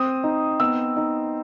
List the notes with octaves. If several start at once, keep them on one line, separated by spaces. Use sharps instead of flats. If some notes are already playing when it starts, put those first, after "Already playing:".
Already playing: C4 D#6
D#4
B3 E6
D#4